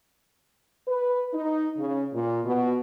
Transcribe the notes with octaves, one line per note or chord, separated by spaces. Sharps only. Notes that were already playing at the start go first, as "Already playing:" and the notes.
B4
D#4
C#3
A#2
B2